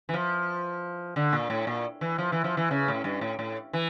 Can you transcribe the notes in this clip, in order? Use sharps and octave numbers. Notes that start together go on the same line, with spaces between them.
E3
F3
D3
A#2
A2
A#2
E3
F3
E3
F3
E3
C#3
A2
G2
A2
A2
E3